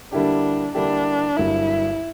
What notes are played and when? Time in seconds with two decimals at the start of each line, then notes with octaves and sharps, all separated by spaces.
0.12 D3 G3 A#3 D4 E4 G4
0.75 D3 G3 A#3 D4 E4 G4
1.37 G1 G2 F#3 A#3 E4